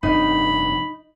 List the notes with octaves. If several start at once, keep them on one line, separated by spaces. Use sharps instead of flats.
F1 G2 D4 D#4 B5